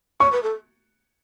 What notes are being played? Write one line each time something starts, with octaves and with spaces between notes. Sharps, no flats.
C#5 C#6
B4
A4